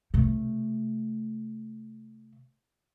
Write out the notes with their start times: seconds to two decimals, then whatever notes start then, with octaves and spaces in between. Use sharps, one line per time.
0.14 C3 A3